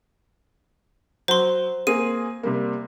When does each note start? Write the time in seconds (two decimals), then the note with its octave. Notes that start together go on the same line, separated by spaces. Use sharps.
1.28 F#3 C5 C6
1.87 A#3 C4 G#4 D#7
2.43 C3 G3 A#3